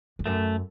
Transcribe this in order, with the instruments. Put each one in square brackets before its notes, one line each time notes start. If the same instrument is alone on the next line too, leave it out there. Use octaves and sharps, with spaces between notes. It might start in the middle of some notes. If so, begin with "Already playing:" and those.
[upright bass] E2
[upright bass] F#2 [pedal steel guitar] A3